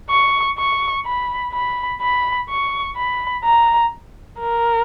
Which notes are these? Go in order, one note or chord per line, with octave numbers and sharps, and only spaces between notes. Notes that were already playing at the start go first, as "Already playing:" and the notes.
C#6
C#6
B5
B5
B5
C#6
B5
A#5
A#4